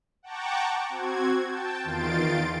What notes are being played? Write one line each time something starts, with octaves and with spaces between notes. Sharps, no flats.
F#5 G5 A5 A#5 C#6 D6
C4 F#4 G#6
G5 A5
E2 D#3 F4 C6 A6 D7